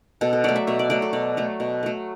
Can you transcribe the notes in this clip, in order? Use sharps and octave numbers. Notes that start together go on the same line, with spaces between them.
B2 A4
A4
F#3 A3 D5
E5
B2 E5
D5
F#3 A3 D5
A4
B2 D5
F#3 A3
B2
F#3 A3